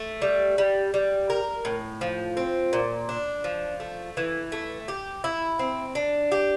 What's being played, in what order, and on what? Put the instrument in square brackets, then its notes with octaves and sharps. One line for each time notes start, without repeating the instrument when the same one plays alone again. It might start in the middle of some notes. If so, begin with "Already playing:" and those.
Already playing: [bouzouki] A3
G3
G3
G3
A#4
A2
F3
C4
A#2
D4
F3
A3
E3
A3
G4
E4
C4
D4
G4